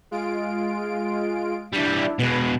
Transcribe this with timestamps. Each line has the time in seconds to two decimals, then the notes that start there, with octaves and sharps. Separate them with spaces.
0.11 G#3 F4 D7
1.73 E3 G3 D4 E4
2.19 B2 G#3 B4